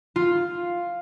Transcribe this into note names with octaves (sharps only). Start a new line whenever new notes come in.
F4